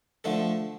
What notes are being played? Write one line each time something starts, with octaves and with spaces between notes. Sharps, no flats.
D3 F3 A3 A4